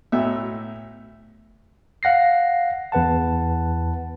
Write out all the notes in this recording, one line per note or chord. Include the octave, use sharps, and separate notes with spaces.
B1 A2 E5
F5 F#5 A#6 C7
E2 B4 F#5 A5